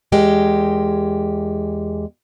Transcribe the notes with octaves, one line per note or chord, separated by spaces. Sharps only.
E2 G#3 G4 A#4